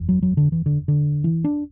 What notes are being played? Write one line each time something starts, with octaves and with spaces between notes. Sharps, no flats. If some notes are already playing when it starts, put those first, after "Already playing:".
Already playing: F#1 E2
F#3
F#3
D3
E3
D3
D3
E3
D4